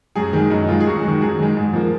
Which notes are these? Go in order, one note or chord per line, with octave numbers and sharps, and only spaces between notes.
F#2 G#4
D#3 G#3
F#2 D#4
D#3 G#3 F4
G#4
F#2 F#4
D#3 G#3 F#4
F#2 G#4
D#3 G#3
G#2
F3 A#3